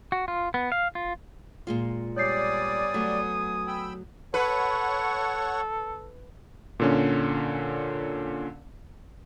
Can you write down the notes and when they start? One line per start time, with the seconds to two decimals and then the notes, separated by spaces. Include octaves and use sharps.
0.12 F#4
0.28 F4
0.54 B3
0.72 F5
0.95 F4
1.67 A#2 G#3 F4
2.16 G3 B3 C#5 D5 G#5 D#6 G6 C7
2.94 F#3 A3
3.68 G5 B5 E6
4.34 A4 B4 C#5 F#5 C#6
6.80 A#2 D3 C#4